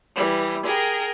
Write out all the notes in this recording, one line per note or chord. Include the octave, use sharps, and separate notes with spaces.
E3 G3
G#4 A#4 G5